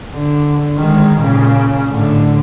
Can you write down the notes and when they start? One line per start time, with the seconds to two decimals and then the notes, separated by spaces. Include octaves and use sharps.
0.14 D3
0.77 D#3 G#3
1.21 A#2 C#3
1.90 A2 D3